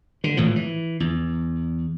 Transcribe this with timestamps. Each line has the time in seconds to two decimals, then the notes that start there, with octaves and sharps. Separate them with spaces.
0.24 D3
0.37 G#1 A2 E3 F3
0.56 E3
1.00 E2